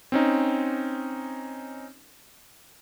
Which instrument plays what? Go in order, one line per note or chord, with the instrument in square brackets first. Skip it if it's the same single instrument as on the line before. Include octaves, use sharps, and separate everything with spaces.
[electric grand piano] C4 C#4 D#4